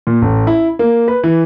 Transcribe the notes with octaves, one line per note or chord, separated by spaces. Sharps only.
A#2
A1
E4
A#3
B4
E3